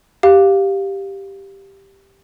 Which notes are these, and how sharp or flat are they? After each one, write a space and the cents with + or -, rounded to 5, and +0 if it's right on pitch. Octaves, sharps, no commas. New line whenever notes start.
G4 +0 F5 +5